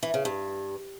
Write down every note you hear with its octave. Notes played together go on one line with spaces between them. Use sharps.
E3
C#3
G2